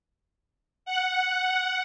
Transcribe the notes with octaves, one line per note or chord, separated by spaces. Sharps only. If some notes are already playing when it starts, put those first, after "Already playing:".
F#5